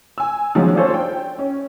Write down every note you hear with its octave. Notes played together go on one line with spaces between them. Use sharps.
G#5 E6
D#3 F3 F#3 G#3 B3 C#4
D4 F4 G#4 A4 C5 C#5
G5
C#4